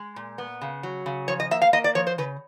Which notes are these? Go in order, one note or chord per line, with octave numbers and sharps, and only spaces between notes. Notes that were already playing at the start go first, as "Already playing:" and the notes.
Already playing: G#3
A#2
B3
C#3
F#3
C#3
F3 C#5
D#5
A#3 E5
F5
A#3 D#5
D5
F3 C#5
C5
C#3 B4